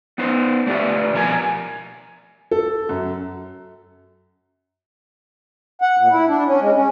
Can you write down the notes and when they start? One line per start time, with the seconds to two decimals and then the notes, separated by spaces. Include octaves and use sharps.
0.18 B3 D#4 B4 C5
0.67 A3 D4 F4 G4 B4 E5
1.14 B2 F3 A#4 C#5 G#5
2.51 A4
2.89 F#2
5.82 F#5
5.98 A#2
6.11 E4
6.28 D4
6.46 C#4
6.61 G#3
6.75 C#4